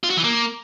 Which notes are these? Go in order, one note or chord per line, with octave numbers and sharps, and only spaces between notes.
F4
F#4
E3
A#3